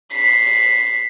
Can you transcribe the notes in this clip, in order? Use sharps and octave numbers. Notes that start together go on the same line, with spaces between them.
B6 C7